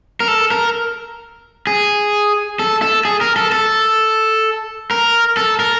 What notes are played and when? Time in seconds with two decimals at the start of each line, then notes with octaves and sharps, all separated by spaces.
0.20 A#4
0.28 A4
0.51 A#4
1.67 G#4
2.59 A4
2.82 A4
3.05 G#4
3.21 A#4
3.36 A4
3.52 A4
4.91 A#4
5.37 A4
5.60 A#4